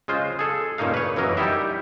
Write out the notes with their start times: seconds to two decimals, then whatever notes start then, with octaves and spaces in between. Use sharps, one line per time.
0.08 C#3 G#3 F4 C5
0.39 G#4 A4
0.78 G2 A#2 C#3 A#3 D#4 F5
0.94 B4 C#5
1.16 F#2 E3 A#3 A#4 D#5
1.37 G3 D#4 E4 G4 E5